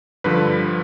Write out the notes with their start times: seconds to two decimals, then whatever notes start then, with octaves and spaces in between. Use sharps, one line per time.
0.24 G2 D3 F3 B4